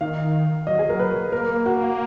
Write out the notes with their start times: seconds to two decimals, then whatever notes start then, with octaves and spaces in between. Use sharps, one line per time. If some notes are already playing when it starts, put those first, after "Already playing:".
0.01 D#3 F5
0.67 F#3 D#5
0.79 G#4
0.89 A#4
0.99 B4
1.32 A#3 A#4
1.66 F#4